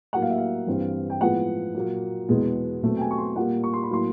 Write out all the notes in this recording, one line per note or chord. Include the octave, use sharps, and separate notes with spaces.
A2 F#3 A#3 F#5
F5
E5
F5
G2 E3 G3 C4
G5
A2 F3 G#3 B3 F#5
A#2 F#3 A#3
E2 B2 G#3 B3
B2 F#3 A3 C4
G5
G#5
C#6
C6
A#2 G3 A#3 F#5
C#6
C6
B5
A2 F#3 A#3 C6